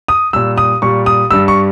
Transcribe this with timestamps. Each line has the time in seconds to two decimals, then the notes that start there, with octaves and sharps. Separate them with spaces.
0.08 D#6
0.33 A#2 G3 E6
0.58 D#6
0.82 A#2 G3 C#6
1.06 D#6
1.31 G2 G3 E6
1.48 C#6